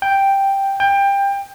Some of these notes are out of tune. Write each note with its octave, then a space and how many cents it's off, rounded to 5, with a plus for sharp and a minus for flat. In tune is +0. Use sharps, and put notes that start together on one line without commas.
G5 +0
G5 +20